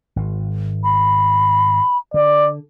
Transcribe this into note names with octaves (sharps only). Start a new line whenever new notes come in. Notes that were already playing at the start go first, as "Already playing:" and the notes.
G#1
B5
D3 D5